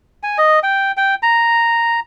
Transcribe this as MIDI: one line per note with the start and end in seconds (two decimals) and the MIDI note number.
0.23 0.38 80
0.38 0.59 75
0.63 0.92 79
0.97 1.15 79
1.23 2.00 82